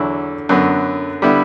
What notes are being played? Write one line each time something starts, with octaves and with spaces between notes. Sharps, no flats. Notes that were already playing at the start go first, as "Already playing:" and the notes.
Already playing: E2 D3 F#3 A3 E4
F#2 D3 F#3 B3
D3 G3 B3 E4